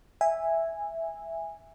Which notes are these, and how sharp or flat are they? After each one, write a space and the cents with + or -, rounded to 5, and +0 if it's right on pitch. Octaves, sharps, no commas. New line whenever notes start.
E5 +0 G#5 -15